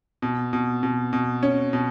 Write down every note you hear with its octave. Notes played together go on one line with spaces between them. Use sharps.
B2
B2
B2
B2
C#4
B2